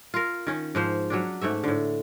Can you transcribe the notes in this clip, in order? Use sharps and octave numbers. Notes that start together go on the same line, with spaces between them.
F4 A#4
D#3 C#4
G#2 F3 C5
F#3 C#4 D4
G#2 A3 C#5 E5
A2 D3